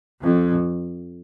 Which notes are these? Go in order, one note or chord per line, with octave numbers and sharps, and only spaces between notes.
F2